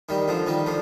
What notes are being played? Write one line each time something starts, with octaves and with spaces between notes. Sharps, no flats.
D#3 G3
D3 F3
D#3 G3
D3 F3